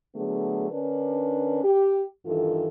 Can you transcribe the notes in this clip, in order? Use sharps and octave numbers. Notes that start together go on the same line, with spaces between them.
D3 F#3 A3 B3 G#4
D3 C#4 D4 A#4 B4
G4
G2 D#3 E3 F4 A4